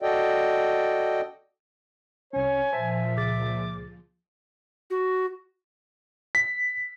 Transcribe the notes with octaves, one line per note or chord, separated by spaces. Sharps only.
F#4 A4 D5 D#5 G5
C2 C#4 C#5 G#5
A#2 F3 C5 E5 A5
C#2 G#4 D6 A6
F#4
B6